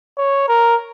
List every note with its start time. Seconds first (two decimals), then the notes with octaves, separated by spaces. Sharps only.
0.18 C#5
0.48 A#4